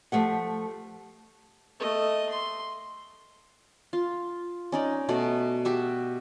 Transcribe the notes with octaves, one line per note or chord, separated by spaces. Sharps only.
F3 A3 G4 F#5
A3 D#5
C6
F4
C#4 D#4 D5
B2 A3 D5
F#4 G4 E5